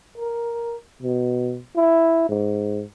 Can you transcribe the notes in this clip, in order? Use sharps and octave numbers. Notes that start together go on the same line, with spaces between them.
A#4
B2
E4
G#2